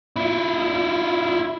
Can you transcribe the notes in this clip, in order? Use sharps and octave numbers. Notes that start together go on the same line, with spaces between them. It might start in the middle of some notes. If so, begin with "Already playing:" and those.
E4 F4